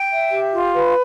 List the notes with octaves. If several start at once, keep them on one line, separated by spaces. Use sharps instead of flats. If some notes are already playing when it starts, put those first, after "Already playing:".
Already playing: G5
E5
G4
F4
B4